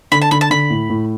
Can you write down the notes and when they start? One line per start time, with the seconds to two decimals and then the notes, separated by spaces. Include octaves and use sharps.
0.12 D3 B5
0.22 A5
0.31 D3 B5
0.41 A5
0.50 D3 B5
0.70 A2
0.90 A2